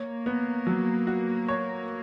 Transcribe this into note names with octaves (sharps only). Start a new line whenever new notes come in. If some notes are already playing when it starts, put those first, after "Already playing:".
Already playing: A#3 C#5
B3
F#3
F#4
C#5